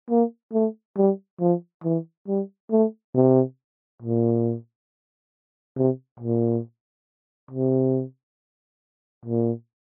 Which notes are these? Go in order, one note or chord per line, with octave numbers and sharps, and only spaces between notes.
A#3
A3
G3
F3
E3
G3
A3
C3
A#2
C3
A#2
C3
A#2